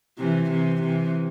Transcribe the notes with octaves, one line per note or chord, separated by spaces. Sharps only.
C3 E3
C3 E3
C3 E3